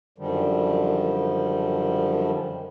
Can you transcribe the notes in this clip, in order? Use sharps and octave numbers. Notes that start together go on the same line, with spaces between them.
F#2 D3 D#3 F3 G3